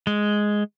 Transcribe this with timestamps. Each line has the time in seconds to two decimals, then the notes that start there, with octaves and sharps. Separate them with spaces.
0.07 G#3